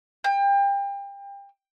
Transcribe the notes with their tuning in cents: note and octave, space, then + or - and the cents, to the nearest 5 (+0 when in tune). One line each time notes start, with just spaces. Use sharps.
G5 +30